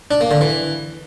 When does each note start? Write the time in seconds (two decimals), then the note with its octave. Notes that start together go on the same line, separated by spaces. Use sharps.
0.11 D4
0.21 A#3
0.31 D3
0.41 E3